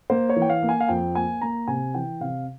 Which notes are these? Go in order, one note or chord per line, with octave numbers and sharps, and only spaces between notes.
A#3 C5
C#5
E3
G5
F5
A#3
G#5
F5
F2 G5
A#3 G#5
A#3 A#5
C3 G#5
E3 G5
C3 F5